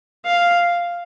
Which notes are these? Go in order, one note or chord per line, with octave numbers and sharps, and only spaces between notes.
F5